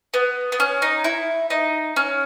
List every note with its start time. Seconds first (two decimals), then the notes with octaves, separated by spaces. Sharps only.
0.14 B3
0.52 B3
0.60 C#4
0.82 D#4
1.04 E4
1.50 D#4
1.96 C#4